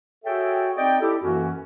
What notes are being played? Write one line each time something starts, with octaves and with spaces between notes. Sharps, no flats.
F#4 G#4 A4 C#5 E5 G5
C4 D#4 D5 D#5 G5
E4 G4 A4
F#2 E3 A#3 C#4 F#4